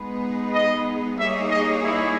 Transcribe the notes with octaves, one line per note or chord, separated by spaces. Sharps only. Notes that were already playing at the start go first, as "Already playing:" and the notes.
Already playing: G#3 B3 D#4 G#4 B4
D#5
G3 A#3 D#4 G#4 C#5 E5
D#5
E4